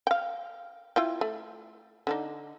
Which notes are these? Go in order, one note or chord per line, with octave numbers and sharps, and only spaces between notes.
F5 G5
E4 F4 G5
A3
D3 D4 D#4